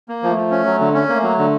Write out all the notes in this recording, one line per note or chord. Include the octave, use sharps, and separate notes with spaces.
A#3
F3 A3
F3
C#4
F#3
D3
C#4
A3 A#3
F#3
D3